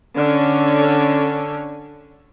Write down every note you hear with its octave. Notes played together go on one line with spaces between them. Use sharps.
D3 C#4